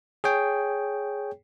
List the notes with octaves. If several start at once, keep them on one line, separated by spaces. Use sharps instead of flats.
G#4 C#5 G5